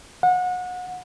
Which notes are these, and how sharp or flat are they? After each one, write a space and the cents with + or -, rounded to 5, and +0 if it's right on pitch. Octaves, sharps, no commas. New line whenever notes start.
F#5 -30